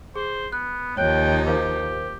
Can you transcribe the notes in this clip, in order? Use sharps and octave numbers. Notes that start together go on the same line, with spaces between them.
G#4 C5
B3 F#6
D#2 F3 D#4 C#5 G5 F#6
G4 A#4 C5 F5